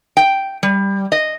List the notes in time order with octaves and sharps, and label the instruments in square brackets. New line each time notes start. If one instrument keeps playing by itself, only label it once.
[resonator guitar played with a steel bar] G5
G3
D#5